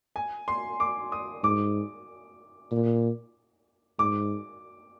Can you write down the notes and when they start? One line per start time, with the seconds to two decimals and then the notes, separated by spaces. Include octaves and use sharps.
0.16 G#5
0.48 C6
0.80 D6
1.12 D#6
1.43 G#2 D6
2.72 A#2
3.99 G#2 D6